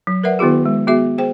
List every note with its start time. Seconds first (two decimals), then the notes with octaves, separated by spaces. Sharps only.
0.07 F#3
0.23 A#4 B4 D5 E5 F#5
0.39 D#3 B3 E4 F#4 G#4
0.66 G#3
0.87 B3 F#4 G#4 E5
1.18 G#4 C5 G5